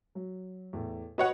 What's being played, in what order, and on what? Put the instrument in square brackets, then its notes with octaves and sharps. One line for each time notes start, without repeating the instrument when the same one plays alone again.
[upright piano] F#3
E2 A2
[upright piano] F#4 D#5 [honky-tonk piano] B4 C#5 F#5